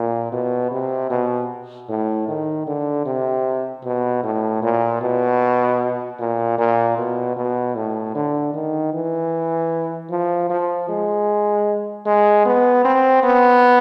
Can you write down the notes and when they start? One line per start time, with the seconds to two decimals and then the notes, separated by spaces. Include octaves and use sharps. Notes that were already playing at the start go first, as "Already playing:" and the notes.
Already playing: A#2
0.32 B2
0.71 C3
1.10 B2
1.89 A2
2.28 D#3
2.67 D3
3.06 C3
3.84 B2
4.23 A2
4.62 A#2
5.01 B2
6.19 A#2
6.58 A#2
6.97 B2
7.37 B2
7.75 A2
8.15 D3
8.54 D#3
8.93 E3
10.10 F3
10.50 F3
10.89 G#3
12.06 G#3
12.45 B3
12.84 C4
13.23 B3